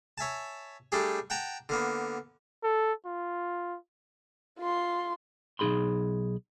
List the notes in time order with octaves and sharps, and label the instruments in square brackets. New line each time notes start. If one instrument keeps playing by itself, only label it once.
[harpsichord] C#5 E5 G#5 A5
G3 A3 D4 G4 G#4
F#5 G5 A5 A#5
D3 A#3 B3
[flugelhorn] A4
F4
[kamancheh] F4 C6
[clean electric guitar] B1 D#4 G#4 B5 C6